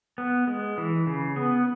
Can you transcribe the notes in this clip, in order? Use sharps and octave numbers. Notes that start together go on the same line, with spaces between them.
B3
G#3
E3
C#3
B3